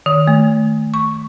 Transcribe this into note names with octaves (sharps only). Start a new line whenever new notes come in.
D#3
A3
C#6